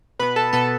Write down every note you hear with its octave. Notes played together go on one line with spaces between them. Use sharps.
B2 B3 B4 B5
A4 A5
B2 B3 A4 A5